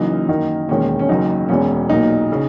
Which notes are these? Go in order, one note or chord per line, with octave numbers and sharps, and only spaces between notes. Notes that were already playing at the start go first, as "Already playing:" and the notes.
Already playing: F#1 F#2 E3 A#3 D#4
F#2 D#3 A#3 D#4
E1 D#2 D#3 G#3 C#4
C#4
F#1 F#2 D#3 D#4
E1 E2 B2 G#3 C#4
B1 A#2 A#3 D#4
C#3